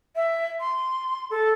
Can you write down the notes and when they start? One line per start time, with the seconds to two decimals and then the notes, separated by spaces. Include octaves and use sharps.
0.16 E5
0.60 C6
1.30 A4